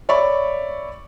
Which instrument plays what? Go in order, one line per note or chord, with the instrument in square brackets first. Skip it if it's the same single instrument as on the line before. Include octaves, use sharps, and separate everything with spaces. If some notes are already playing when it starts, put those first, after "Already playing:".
[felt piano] C#5 D5 E5 B5 C#6